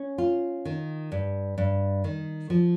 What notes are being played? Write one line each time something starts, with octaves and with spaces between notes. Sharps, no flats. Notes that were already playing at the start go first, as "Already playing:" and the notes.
Already playing: C#4
F4
D#3
G2
G2
D#3
F3